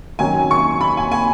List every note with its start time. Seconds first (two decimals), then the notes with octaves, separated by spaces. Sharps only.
0.19 D#3 F#3 C#4 G#5
0.51 C#6
0.81 B5
0.97 G#5
1.12 G#5